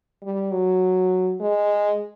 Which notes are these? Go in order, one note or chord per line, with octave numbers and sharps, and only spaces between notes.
G3
F#3
G#3